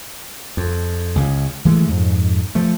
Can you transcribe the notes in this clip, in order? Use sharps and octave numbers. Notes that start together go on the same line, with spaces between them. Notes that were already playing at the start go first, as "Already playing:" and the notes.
F2
C#2 C#3
E3 G#3 A3
F2 G#2
F3 A3